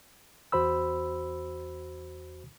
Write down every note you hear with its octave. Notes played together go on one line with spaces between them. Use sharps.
E2 F#4 C5 B5 E6